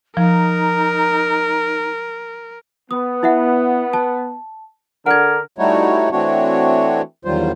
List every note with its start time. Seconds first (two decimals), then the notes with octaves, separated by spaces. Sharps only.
0.17 F3 D#4 A#4
2.91 B3 D#6
3.23 E4 E5 F#5
3.93 A5
5.06 D3 A#4 F#5 G#6
5.58 G3 A3 D#4 E4 F#4 C#5
6.12 E3 A3 C4 D4 F#4 C#5
7.25 E2 D#3 F#3 G3 F4 C5